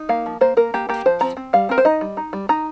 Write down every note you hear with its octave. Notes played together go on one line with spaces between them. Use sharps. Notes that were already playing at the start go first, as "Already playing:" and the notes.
Already playing: D#4
A#3 F5
F3
A#3 C5
A#3 A#4
A#3 G4
A#3 G4
F3 C5
C4 A#5
C4
G3 F5
C4 A#4
C5
D#4 D#5
G3
D#4
G3
D#4 A#5